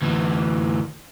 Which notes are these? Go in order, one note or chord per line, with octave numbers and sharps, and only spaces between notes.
D2 E3